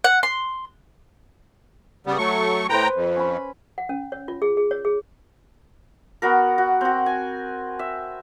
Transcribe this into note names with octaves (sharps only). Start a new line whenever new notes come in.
F#5
C6
C#3 G3 B3
F#3 A3 C#6
A2 B4 C5 G5 A#5
F2
C#4 B5
F#5
C#4
C#5
F4
G#4
G#4
C#5
G#4
B3 F#4 A#4
F#4
C4 F#4
G#5
E5